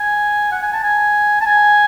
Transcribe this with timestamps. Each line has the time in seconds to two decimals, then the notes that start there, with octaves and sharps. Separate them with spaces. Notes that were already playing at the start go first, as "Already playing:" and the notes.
Already playing: G#5
0.52 F#5
0.63 G#5
0.73 A5
0.83 G#5
1.41 A5
1.46 G#5